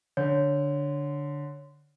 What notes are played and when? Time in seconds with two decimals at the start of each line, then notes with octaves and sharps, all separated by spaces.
0.17 D3 C#5